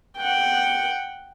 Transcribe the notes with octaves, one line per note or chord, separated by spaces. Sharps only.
F#5 G5